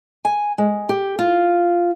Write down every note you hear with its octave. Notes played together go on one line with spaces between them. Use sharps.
G#5
G#3
G4
F4